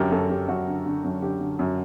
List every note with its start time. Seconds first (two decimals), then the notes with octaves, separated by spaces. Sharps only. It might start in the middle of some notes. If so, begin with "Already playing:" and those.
Already playing: F#2 D3 G4 A#4
0.11 F#2 A4
0.30 F#2 G4
0.48 F#2 F#4
0.68 D3
0.86 D3
1.04 F#2
1.22 D3 G4
1.40 D3
1.59 F#2